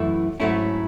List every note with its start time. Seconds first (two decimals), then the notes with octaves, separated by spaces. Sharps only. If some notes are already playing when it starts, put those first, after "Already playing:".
Already playing: F#2 E3 A3 E4
0.40 G#2 F#3 A3 C#4 E4